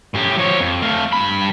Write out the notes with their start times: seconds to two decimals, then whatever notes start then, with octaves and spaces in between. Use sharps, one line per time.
0.15 A2 G4
0.39 F3 C#5
0.60 F2
0.82 A3 F5
1.13 G2 B5